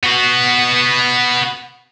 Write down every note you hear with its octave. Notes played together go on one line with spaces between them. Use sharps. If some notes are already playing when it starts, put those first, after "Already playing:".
B3 F#4